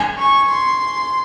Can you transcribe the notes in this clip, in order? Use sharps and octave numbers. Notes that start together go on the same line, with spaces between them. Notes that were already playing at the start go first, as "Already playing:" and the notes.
Already playing: G#5
C#6
C6